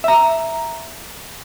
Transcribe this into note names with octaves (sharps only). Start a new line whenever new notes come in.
E5 A#5